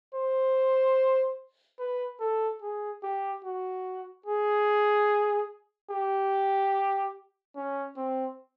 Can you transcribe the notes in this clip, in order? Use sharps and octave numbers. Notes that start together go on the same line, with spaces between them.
C5
B4
A4
G#4
G4
F#4
G#4
G4
C#4
C4